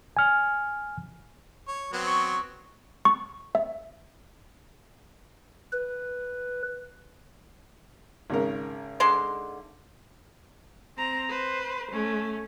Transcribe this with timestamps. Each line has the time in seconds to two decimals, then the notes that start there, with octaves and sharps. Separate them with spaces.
0.17 G#5 F6
1.68 C#5
1.93 F#3 B3 C4
2.07 C#6
3.05 C#6
3.55 E5
5.72 B4
8.30 G#1 C#3 A#4
9.00 D3 G#3 C6
10.98 C4 A#5
11.29 B4 C5
11.92 A3 C#4